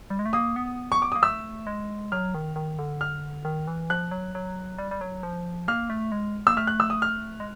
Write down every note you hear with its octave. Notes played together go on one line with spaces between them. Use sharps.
G3
G#3
A3
A#3 D#6
B3
C#6
D6
A#3 D#6
A3 E6
G#3
F#3 F6
D#3
D#3
D3
F6
D#3
E3
F3 F#6
F#3
F#3
G3
G3
F#3
F3
A#3 F6
A3
G#3
A#3 E6
A3 F6
F#6
E6
D#6
F6
G#3